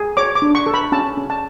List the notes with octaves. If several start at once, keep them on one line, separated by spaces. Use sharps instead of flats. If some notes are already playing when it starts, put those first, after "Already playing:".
Already playing: G#4
C#5 D6
D6
D4
C#6
A4
B5
C#4 A5
C#4
A5